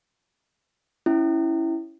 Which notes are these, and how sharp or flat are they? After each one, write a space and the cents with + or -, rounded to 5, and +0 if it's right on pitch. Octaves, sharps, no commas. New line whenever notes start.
C#4 +0 E4 +0